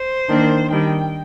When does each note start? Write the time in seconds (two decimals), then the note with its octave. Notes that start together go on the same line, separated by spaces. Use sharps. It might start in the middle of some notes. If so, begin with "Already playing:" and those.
Already playing: C5
0.29 D#3 A#3 D4
0.70 D#3 G3 D4 G5